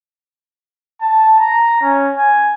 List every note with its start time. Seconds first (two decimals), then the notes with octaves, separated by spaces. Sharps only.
1.01 A5
1.40 A#5
1.82 C#4
2.17 G#5